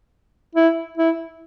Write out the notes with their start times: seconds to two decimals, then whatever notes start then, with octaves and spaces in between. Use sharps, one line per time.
0.55 E4
0.98 E4